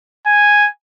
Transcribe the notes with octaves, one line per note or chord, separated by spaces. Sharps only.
G#5